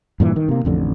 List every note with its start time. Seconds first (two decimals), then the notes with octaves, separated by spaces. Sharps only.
0.20 G2 A#2 C#3 E3
0.36 D#3
0.49 C3 A#3
0.65 A1 F2 D3